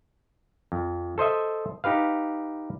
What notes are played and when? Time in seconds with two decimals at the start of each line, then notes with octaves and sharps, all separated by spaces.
0.72 F2
1.18 A4 C5 D#5 E5
1.84 D#4 G4 B4 F5